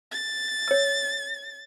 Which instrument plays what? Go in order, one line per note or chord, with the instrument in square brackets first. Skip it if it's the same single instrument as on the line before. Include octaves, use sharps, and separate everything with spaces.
[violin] A6
[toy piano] C#5 E6